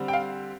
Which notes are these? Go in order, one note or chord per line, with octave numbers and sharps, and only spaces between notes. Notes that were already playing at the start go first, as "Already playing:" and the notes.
Already playing: D3 G3 C4
G5
F5